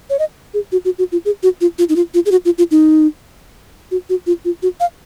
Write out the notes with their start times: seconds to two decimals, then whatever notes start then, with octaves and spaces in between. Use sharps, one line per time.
0.10 C#5
0.19 D#5
0.54 G#4
0.72 F#4
0.85 F#4
0.99 F#4
1.12 F4
1.25 G#4
1.43 F#4
1.61 F4
1.79 F4
1.89 D#4
1.96 F4
2.14 F4
2.26 G#4
2.31 F#4
2.45 F4
2.58 F4
2.71 D#4
3.91 F#4
4.09 F#4
4.27 F4
4.45 F4
4.62 F#4
4.80 F5